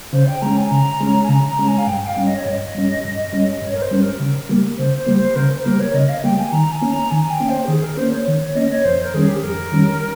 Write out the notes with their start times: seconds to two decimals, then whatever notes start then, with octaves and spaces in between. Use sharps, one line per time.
0.13 C#3 C5
0.27 G5
0.42 G#3 C#4 A#5
0.57 G#5
0.71 C#3 A#5
1.01 G#3 C#4
1.23 G#5
1.29 C#3 A#5
1.49 A#5
1.59 G#3 C#4
1.68 G#5
1.78 F5
1.87 G2 G5
2.07 F5
2.17 G3 C#4
2.26 D#5
2.37 C#5
2.46 G2 D#5
2.75 G3 C#4
3.04 G2
3.32 G3 C#4
3.61 G2 C#5
3.75 A#4
3.82 C5
3.91 G3 C#4
4.00 A#4
4.20 C#3
4.49 G3 A#3
4.78 C#3 C5
4.97 C5
5.07 G3 A#3
5.17 C5
5.36 C#3 A#4
5.58 C5
5.65 G3 A#3 A#4
5.80 C#5
5.94 C#3 D#5
6.09 F5
6.23 G3 A#3 G5
6.38 G#5
6.52 D#3 A#5
6.72 G#5
6.82 A#3 C#4
6.91 A#5
7.11 D#3 G#5
7.30 G5
7.40 A#3 C#4
7.49 C5
7.65 G4
7.68 D#3 G#4
7.83 A#4
7.97 A#3 C#4 C5
8.12 C#5
8.28 D#3
8.42 C#5
8.55 A#3 C#4 D#5
8.70 C#5
8.85 F2 C5
9.03 A#4
9.14 D#3 G3 C#4 G#4
9.28 G4
9.36 G#4
9.43 F2 A#4
9.72 D#3 G3 C#4